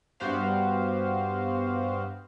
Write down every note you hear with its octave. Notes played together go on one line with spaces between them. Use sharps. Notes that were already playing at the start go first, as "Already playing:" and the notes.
G2 B3 F#4 G4 C5 F5